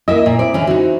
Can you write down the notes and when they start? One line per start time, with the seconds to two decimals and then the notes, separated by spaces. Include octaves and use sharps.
0.08 A#3 E4 D#5 E5
0.26 A#2
0.39 C4 E4 D5
0.54 D3 E3 C#4
0.67 D#4 F#4